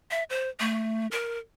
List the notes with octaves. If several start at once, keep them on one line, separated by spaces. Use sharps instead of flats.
E5
C5
A3
A#4